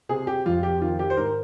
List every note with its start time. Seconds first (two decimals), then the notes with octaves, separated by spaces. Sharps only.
0.09 C3 G#4
0.27 G4
0.46 F2 F4
0.63 G4
0.82 D#3 F4
0.99 G4
1.10 C5
1.17 G#2 A#4